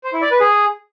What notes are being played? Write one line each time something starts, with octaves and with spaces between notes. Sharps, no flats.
C5
E4
D5
B4
G#4